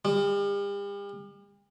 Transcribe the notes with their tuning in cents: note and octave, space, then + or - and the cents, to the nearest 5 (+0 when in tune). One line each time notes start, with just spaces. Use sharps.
G3 +40